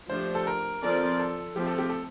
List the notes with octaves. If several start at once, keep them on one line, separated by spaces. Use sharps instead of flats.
F3 A3 D4 G4 C5
A4
A#4
F3 C4 F4 A4 A#4 D5
A4
F3 A3 C4 G4
A4
G4
A4